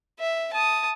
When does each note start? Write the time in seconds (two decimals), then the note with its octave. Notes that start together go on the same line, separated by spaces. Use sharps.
0.20 E5
0.53 A5 D#6